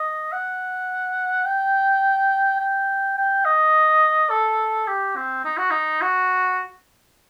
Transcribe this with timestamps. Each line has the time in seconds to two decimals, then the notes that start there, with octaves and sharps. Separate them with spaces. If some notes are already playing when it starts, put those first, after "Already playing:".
Already playing: D#5
0.32 F#5
1.45 G5
2.60 G5
3.17 G5
3.45 D#5
4.30 A4
4.88 G4
5.16 C4
5.44 D#4
5.57 F#4
5.71 D#4
6.01 F#4